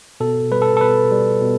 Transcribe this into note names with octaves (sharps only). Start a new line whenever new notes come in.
B2 A4
G3 B4
A4
A4
B2 B4
G3
B2